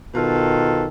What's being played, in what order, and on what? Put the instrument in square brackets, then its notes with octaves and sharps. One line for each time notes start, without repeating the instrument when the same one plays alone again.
[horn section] B2 D#3 F4 A4